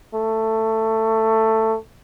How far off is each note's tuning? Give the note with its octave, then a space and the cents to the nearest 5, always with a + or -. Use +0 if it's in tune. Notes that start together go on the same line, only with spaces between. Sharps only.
A3 +15